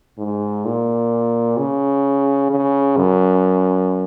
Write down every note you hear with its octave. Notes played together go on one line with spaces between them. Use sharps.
G#2
A#2
C#3
C#3
F#2